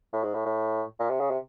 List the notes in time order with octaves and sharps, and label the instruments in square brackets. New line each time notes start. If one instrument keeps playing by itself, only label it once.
[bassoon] A2
G#2
A2
A2
A#2
C3
C#3
C3